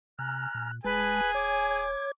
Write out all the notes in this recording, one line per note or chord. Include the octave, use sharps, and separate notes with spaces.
C3 G#5 A#5 F6 F#6
A#2
D#1 G#3 G#4 B4 G#5 A5
C#5 D6 G#6